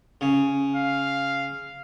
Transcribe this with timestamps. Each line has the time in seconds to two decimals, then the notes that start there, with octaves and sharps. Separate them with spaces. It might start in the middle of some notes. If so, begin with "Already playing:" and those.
0.21 C#3
0.75 F5